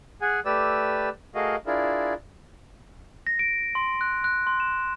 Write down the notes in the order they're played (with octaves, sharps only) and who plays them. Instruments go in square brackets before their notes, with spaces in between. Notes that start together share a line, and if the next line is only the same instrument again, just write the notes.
[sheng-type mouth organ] G#4 F#5 G#5
A3 G4 B4 D5 E6
A3 F#4 G#4 A#4 D#5 F5
D4 E4 F4 G#4 A#4
[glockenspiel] A#6
D7
C6
F#6
F#6
C6
E7